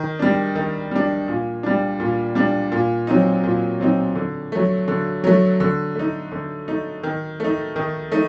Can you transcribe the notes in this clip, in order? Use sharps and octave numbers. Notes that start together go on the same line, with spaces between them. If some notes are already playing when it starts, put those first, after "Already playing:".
Already playing: D#3
G3 D4
D#3
G3 D4
A#2
G3 D4
A#2
G3 D4
A#2
F#3 C4 D#4
A#2
F#3 C4 D#4
D3
F#3 A3
D3
F#3 A3
D3
A3 D#4
D3
A3 D#4
D#3
A3 D#4
D#3
A3 D#4